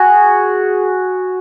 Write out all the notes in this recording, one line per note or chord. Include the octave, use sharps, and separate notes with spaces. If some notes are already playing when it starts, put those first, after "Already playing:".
Already playing: F#4 G#4